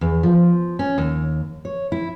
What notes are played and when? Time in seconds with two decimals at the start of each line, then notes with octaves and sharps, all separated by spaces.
0.01 E2
0.23 F3
0.79 C#4
0.98 D#2
1.65 C#5
1.92 E4